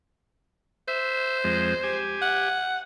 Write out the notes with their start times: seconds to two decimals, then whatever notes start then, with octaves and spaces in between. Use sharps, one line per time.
0.88 C5 E5
1.44 F2 G#3
1.83 G4 G#5
2.22 F#5